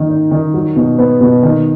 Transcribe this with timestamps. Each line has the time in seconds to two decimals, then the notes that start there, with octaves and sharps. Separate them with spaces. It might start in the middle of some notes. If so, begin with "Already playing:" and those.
Already playing: D#3 A#3
0.08 D#4
0.31 D#3
0.54 F#3
0.76 B2
0.98 B3
1.21 B2
1.43 D#3